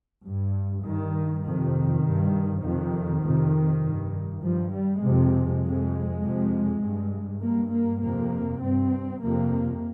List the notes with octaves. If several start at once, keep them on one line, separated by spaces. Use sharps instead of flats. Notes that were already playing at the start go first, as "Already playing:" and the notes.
G2
G2 D#3
F2 C3 D#3
G2
F2 C3 D#3
F2 C3
G2
G2 F3
G3
F2 C3 G#3
F2 C3
F2 C3
G2
G2 A#3
A#3
F2 C3 A#3
G2 C4
F2 C3 A#3